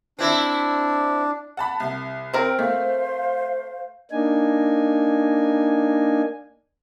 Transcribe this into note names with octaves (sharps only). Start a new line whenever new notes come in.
C4 D4 E4
F#5 A5 B5
C2
C4 A#4 G5
A3 C5 F5
A#3 D4 D#4 G#5